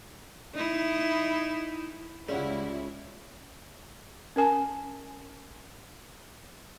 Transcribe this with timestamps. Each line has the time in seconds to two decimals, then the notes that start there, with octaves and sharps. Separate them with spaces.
0.55 D#4 E4
2.29 C#2 G3 C#4 E4 F4 G#4 F#5
4.36 C#4 A#4 G#5 A5